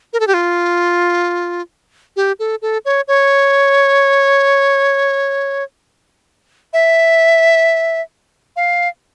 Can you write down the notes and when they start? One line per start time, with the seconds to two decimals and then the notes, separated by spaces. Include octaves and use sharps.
0.13 A#4
0.20 A4
0.27 G4
0.34 F4
2.16 G4
2.39 A4
2.62 A4
2.85 C#5
3.08 C#5
6.73 E5
8.56 F5